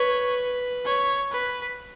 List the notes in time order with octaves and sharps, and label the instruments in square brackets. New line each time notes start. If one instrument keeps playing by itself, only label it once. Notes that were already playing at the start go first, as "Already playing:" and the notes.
Already playing: [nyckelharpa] B4 [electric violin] C#5
[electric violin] C#5
B4